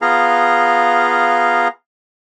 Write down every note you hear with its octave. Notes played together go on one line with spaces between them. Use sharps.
B3 F4 G#4 F5 A#5